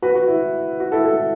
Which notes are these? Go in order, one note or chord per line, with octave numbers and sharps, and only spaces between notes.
F#4 B4
F#4
E4
F#4
E4 A4
E4 A4